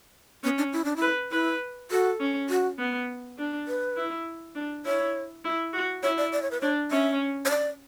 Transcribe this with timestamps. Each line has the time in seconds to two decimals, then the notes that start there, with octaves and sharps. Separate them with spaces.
0.43 B3 C#4
0.58 D4
0.73 E4
0.85 D4
0.96 E4
1.02 B4
1.31 E4 B4
1.91 F#4 A4
2.20 C#4
2.50 F#4
2.78 B3
3.38 D4
3.67 B4
3.97 E4
4.55 D4
4.85 E4 C#5
5.45 E4
5.73 F#4
6.03 E4 C#5
6.18 D5
6.33 D5
6.42 C#5
6.51 B4
6.61 D4 C#5
6.91 C#4 E5
7.45 C#5
7.50 D5